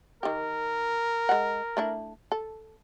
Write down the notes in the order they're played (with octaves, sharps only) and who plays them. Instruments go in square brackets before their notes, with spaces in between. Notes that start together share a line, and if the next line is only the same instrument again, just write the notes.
[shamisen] D#3 G4 [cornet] A#4
[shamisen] G#3 F#5
A3 D4 E4
A4